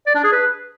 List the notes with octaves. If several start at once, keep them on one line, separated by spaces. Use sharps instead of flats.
D5
D4
G#4
B4